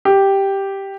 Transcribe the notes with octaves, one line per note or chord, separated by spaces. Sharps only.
G4